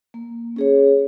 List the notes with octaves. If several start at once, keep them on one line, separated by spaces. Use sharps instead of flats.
A#3
C#4 G#4 C#5